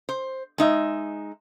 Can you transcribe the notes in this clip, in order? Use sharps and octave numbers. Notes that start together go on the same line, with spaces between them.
C5
G#3 D#4 E5